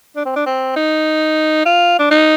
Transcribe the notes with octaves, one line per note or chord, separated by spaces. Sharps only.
D4
C4
D4
C4
D#4
F4
D4
D#4